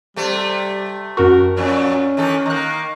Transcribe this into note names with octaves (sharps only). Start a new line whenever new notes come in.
C3 G3 A3
F#2 F#4 A#4
F2 A#2 F#3 C#4
D#3 E3 A4
D#3 A#3 A#5 F#6